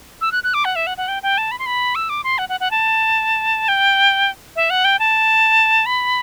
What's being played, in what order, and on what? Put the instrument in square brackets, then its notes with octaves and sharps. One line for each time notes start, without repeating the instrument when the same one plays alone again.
[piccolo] E6
F#6
F#6
D6
F#5
E5
F#5
F#5
G5
G5
A5
B5
C6
B5
E6
D6
C6
F#5
F#5
F#5
A5
G5
E5
F#5
G5
A5
B5